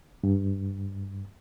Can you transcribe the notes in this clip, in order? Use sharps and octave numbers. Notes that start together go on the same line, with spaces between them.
G2